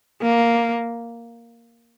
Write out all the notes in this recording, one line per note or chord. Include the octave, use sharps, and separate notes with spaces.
A#3